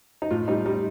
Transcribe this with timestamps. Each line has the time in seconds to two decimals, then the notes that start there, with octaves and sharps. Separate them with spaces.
0.22 D#4
0.31 A2 F4
0.48 G3 D#4
0.66 G3 D#4